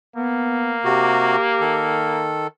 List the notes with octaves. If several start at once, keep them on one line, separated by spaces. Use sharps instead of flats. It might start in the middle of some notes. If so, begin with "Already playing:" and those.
A#3 B3
C3 F#4 G4
D#3 A4